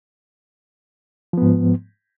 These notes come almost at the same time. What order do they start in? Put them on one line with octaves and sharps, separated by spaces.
F3 B3 G#2